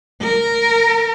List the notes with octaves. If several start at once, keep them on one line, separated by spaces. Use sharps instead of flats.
A#4